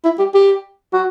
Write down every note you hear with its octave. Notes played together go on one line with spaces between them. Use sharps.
E4
G4
G4
F#4